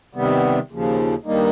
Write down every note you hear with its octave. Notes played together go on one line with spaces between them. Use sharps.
C3 D#3 G3 B3
D#2 C#3 F3
G2 D#3 G3 A#3 D#4